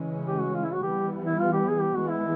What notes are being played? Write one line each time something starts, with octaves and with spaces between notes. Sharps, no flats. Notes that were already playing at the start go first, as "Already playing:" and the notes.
Already playing: C#3 E3 G#3 C#4
G4
F#4
F4
E4
F#4
E3 G3 B3 G4
E4
F4
G4
G#4
G4
E3 G#3 B3 F#4
E4